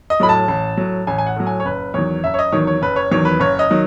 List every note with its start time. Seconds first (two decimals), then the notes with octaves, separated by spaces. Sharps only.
0.10 D#5
0.20 A2 F#3 B5
0.29 A5
0.48 A1
0.77 A2 F#3
1.07 A1 G#5
1.18 G#5
1.26 F#5
1.36 A2 F#3
1.47 G#5
1.60 C#5
1.65 F#1 B4
1.94 E2 D#3 F#3 C#5
2.24 F#1 E5
2.34 C#5
2.39 D#5
2.52 E2 D#3 F#3 C#5
2.67 C#5
2.82 F#1 B4
2.96 C#5
3.11 E2 D#3 F#3 C#5
3.25 B4
3.40 F#1 C#5
3.59 D#5
3.70 D#3 F#3